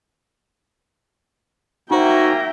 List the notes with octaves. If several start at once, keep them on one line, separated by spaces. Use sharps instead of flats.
A#3 D#4 F#4 C5 E5 G5 G#5 A#5